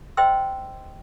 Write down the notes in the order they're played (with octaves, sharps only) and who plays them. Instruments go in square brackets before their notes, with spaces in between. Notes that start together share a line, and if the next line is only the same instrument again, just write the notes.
[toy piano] C5 D#5 G5 C6 E6